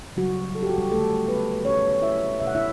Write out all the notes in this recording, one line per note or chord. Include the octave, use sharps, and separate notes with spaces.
C#3 F#3 G3 F#4
A4
G4
F#4
G3 G4
D3 A3 A4
B3 B4
B2 G3 C#4 C#5
E4 E5
B2 A3 E5
F#5
E4 E5